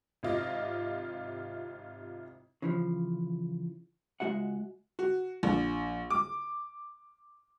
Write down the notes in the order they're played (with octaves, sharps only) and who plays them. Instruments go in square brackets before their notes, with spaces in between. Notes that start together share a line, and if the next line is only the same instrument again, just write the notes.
[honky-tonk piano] G#1 C3 E4 F4 D#5 D6
[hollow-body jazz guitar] C#3 E3 F3
C#2 A#2 G#3 F#4 E5 F#5
[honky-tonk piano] F#4
A#1
D6